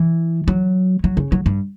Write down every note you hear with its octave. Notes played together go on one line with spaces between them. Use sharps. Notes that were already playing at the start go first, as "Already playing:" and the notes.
Already playing: E3
F#3
F#3
C#3
F#3
G2